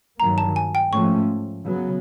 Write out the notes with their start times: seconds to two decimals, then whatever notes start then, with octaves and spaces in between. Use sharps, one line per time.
0.20 G2 D#3 F#3 A#3 A#5
0.38 A5
0.56 G#5
0.75 G5
0.93 G#2 F3 A3 C#4 C#6
1.65 C#3 F#3 B3